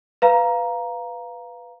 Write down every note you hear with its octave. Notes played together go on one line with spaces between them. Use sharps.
B4 F5 A#5